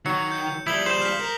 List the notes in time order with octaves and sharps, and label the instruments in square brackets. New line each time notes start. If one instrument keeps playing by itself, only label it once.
[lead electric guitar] D#3 [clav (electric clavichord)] F#3 [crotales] C#7
[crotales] G6 C#7
[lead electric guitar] F3 G3 [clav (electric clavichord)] E4 [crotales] D#6 F#7 G7
[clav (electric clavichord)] C5 [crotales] G6 E7
[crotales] F6 B6
[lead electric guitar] A#4